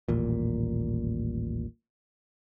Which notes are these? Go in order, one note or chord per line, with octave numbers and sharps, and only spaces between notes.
D#1 A1 A#2